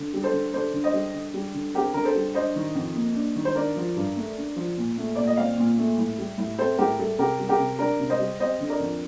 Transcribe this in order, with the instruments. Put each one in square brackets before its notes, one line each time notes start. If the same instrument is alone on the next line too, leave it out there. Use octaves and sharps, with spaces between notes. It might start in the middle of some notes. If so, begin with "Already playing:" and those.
Already playing: [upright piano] D3
G3
A4 C5
D3
D4 A4 C5
D3
C5 D#5
G3
D3
G3
D3
C4 G4 A#4
D3 A#4
A4 C5
G3
D4 C5 D#5
D#3
F2
A#3
D4
D#3
C5
D4 A#4 D5
F3
G2
A3
D4
F3
A#2
A3
A#2 D5
D#5
C4 D5 F5
A#2
A3
A2
G3
A2
C4 A4 C5
A2 G4 A#4
G3 A4
C3 G4 A#4
G3
G4 A#4
C3
D4 A#4 D5
C3
C5 D#5
G3
C4 C5 D#5
D3
A#4 D5
F2